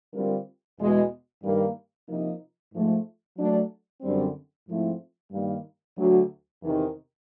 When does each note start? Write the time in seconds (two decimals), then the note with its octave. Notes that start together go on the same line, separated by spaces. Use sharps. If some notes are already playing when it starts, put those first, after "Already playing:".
0.12 D3 G3 C4 F4 A#4
0.78 E2 B2 G#3
1.42 G2 D#3 G3 A#3
2.08 C3 F3 A#3 D#4
2.72 G#2 F3 A3
3.37 F#3 A3 D4
4.01 F#2 D3 G3 C4
4.67 G#2 F3 A3 C4 E4
5.31 G2 D#3 G3 A#3
5.97 D2 D3 F#3
6.62 E2 C3 D#3